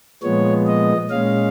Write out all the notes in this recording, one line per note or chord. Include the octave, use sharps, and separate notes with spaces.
A#2 F3 G#3 B3 C#5
D#5
A#2 G#3 C#4 F5